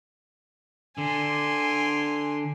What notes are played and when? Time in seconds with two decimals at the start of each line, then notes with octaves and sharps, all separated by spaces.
0.98 D3 G#5 C6